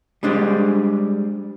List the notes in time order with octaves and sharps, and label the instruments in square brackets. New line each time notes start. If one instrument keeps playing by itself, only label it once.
[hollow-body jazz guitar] G3 G#3 D4 C5 D5